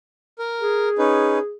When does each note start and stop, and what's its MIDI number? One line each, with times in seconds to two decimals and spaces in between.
0.39 0.89 70
0.60 1.55 68
0.98 1.39 61
0.98 1.39 63
0.98 1.39 71